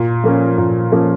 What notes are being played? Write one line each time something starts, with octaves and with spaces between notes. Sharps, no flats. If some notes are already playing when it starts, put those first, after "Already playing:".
Already playing: A#2
F3 A#3 C#4
A#2
F3 A#3 C#4